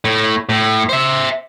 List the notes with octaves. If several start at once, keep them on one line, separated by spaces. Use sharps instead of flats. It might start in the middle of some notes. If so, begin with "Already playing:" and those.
A2
A2
C5 E5